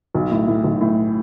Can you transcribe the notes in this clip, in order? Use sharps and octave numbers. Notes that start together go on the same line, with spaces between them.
B1
A2
A2
B1
A2